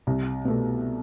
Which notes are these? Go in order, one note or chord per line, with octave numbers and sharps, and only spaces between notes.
C2
B2 A3